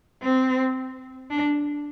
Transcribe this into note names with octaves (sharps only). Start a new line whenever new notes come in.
C4
D4